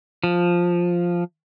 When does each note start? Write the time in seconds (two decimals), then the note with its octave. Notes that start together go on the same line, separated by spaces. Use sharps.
0.24 F3